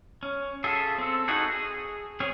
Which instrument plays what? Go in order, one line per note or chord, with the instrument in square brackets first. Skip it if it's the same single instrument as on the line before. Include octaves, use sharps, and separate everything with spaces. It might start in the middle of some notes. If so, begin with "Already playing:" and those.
[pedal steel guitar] C#4
F4 G#4 A4 E5
C4 A4
D#4 E4 F#4 G#4 A4
G#4
C4 C#4 G#4 C#5